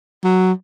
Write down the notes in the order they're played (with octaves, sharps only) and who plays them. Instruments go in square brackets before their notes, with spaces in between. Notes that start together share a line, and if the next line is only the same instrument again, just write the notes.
[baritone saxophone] F#3